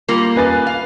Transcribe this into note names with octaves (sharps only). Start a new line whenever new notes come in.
G3 A#3 F4
B4 G#5 A6
F5